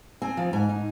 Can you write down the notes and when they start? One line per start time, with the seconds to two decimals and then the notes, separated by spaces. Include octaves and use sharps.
0.22 C4 G#5
0.37 F3
0.53 G#2 G#5
0.69 D#4